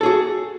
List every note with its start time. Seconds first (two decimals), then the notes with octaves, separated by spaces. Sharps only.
0.01 A4
0.03 G#4
0.06 F#4